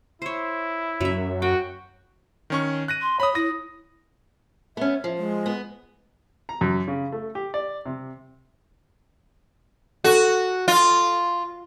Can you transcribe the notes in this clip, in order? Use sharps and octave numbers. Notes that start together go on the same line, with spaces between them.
E4 C5 C#5
F#2 F#3 E5
F#4 G5
D#3 C#4 C#6
F#6 A#6 D#7
C6
C#5 B5 D#6
E4 D#6 A#6
B3 C#4 E5
F3
G#3
B3
A#5
F#2
C#3
A3
G4
D5
C3
F#4 A4
F4